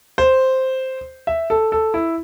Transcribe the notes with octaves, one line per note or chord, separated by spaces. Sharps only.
C5
E5
A4
A4
E4